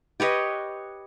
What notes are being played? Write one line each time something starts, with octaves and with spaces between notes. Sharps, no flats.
G4 B4 C#5 D#5